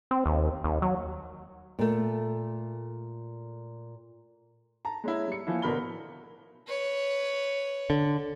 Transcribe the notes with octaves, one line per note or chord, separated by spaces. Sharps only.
C4
D#2
D#2
F#3
A#2 A3
A5 A#5
G#3 C#4 E4
G3 C#7
E3 F3 A#3 E4
A1 B2 D3 A#4 B5 G7
B4 C#5
D3